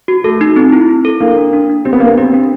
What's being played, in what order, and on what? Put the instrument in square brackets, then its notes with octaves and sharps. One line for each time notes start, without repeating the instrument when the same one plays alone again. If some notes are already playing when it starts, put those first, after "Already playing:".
[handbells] F#4
[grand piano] A3 [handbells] A4
[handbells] D#4
C4
E4
E4
A4
[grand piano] A#3 [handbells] D4
[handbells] D4
D4
D4
[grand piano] C4 [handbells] G4
[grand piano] B3
[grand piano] A#3 [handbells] D4
[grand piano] B3
[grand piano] C4 [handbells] G4
[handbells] D4